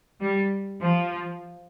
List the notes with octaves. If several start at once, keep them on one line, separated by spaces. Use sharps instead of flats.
G3
F3